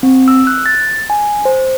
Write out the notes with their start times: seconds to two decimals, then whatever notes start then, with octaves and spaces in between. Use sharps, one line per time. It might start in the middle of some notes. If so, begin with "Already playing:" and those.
0.03 C4
0.28 E6
0.47 F#6
0.66 A6
1.10 G#5
1.45 C5